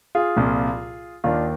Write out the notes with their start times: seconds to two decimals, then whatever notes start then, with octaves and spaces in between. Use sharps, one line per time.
0.15 F4 G#4
0.36 C2 A#2 F3
1.24 D#2 D#3 D4 F4